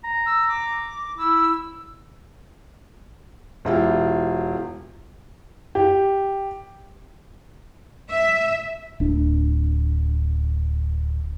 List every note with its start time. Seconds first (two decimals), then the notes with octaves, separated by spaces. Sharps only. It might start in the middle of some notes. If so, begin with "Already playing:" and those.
0.04 A#5
0.26 E6
0.48 D6
1.18 E4 E6
3.65 E1 E4 F4 G4
5.75 G4
8.10 E5
9.00 D1 D4